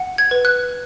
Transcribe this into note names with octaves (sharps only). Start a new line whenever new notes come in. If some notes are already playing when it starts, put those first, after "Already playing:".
Already playing: F#5
G#6
B4
F#6